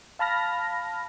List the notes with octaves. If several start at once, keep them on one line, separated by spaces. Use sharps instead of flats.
F5 A5 B5 F6 A#6